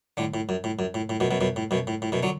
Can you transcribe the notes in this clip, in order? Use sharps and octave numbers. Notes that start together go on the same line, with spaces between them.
A2 D3
A2
F#2
A2
F#2
A2
A2
F#2 B2
F#2 B2
F#2 B2
A2
F#2 B2
A2
A2
F#2 B2
D3 F#3